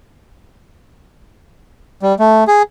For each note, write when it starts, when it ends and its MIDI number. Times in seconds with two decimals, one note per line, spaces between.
2.03 2.15 55
2.20 2.44 57
2.48 2.62 68